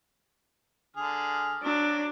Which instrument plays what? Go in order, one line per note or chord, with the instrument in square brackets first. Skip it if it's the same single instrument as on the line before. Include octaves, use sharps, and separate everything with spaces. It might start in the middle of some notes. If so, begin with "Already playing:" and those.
[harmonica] D3 G#4 F6
[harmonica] F#3 [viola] D4